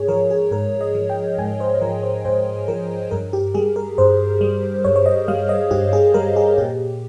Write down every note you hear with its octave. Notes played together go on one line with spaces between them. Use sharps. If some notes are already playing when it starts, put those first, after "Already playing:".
Already playing: G#2 G#4 C#5
F3 A#4
G#4
G#2 A#4
D#5
F3
G5
G#2 G#5
C5
C5
F3 A#4
C5
G#2 C5
F3 A#4
G2 A#4
G4
G3 G#4
A#4
G2 C5
G3
G2 C#5
C#5
D#5
G3 F5
D#5
G2 G4
G#4
G3 A#4
G#4
A#2 G4